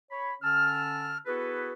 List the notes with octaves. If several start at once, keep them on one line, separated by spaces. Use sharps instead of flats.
C#5 B5
D3 C#4 A5 E6 F6
B3 E4 F#4 G#4 A4 B4